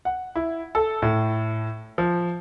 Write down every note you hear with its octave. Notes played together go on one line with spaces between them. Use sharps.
F#5
E4
A4
A2
F3